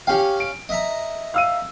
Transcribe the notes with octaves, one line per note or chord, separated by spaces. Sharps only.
C#4 G4 F5 G5
D7
D#5 E5 A#5
F5 E6 D#7